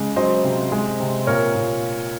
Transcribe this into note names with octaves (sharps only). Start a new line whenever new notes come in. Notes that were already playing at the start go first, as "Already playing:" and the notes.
Already playing: C#3 G#3
F#3 C5 D#5
C3
G#3
C3
A#2 A#4 C#5
A#2